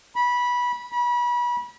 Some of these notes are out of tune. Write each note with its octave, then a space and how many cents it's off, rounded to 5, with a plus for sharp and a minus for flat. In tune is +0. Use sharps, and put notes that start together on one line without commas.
B5 -15
B5 -30